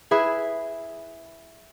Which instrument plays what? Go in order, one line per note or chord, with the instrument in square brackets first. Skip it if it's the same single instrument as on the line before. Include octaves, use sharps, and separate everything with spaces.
[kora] E4 G#4 B4 E5